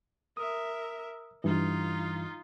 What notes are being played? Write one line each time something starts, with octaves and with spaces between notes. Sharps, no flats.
A#4 E5 D#6
G2 E3 D#4 F4